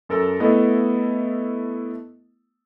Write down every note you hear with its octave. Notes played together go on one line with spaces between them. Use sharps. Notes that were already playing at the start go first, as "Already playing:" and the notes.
F#2 A4 A#4 E6
A3 B3 E4 A4 D#5